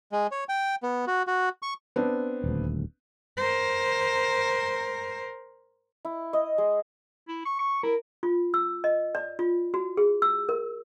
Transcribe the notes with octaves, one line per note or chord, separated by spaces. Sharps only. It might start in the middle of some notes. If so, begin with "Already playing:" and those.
G#3
C#5
G5
B3
F#4
F#4
C#6
B3 C4 D4
D#1 D2
A#4 C5
E4
D#5
G#3
E4
C#6
C#6
E4 A#4
F4
E6
D#5
D5
F4
F#4
G#4
E6
A#4